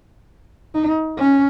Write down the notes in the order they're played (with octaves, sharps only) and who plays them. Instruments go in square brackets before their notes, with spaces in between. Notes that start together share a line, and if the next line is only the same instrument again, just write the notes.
[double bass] D#4
C#4